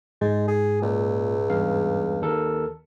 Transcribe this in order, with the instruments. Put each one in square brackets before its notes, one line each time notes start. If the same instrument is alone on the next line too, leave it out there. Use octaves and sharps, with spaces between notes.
[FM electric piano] G#2 [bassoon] G#3
[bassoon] G#4
[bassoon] C#2 [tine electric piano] A#2
[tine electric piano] E2 G2 F5
D#2 A4 A#4